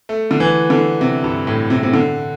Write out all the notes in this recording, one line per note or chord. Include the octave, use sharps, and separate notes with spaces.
A3
D3
E3
D3
C3
G2
A2
C3
C3
D3